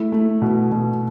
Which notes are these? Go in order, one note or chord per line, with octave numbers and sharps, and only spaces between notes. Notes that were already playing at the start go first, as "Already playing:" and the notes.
Already playing: A3 E4
A3
B2
B2